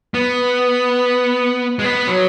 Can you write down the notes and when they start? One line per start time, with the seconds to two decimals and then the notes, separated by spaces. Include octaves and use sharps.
0.14 B3
1.79 G#3
1.84 B3
2.07 F#3